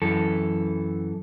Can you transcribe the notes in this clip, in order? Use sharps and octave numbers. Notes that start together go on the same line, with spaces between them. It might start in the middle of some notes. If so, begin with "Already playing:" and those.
F#2 E3 A4